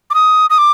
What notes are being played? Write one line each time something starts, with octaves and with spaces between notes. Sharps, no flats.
D6
D#6
D#6
D6